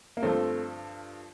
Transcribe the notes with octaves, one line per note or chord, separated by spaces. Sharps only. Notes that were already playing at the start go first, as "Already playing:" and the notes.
A#3
G2 D3 F3 A3 C4